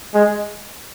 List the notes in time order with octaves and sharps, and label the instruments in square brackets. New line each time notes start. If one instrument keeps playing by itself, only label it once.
[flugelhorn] G#3